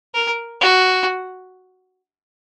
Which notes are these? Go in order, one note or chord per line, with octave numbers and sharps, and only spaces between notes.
A#4
F#4